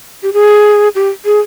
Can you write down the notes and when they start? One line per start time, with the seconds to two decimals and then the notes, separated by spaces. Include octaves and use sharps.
0.23 G4
0.33 G#4
0.95 G4
1.25 G#4